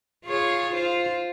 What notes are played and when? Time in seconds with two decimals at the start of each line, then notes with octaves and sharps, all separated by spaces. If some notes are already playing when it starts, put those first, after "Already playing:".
0.25 F4 G#4 C#5
0.73 F4 C5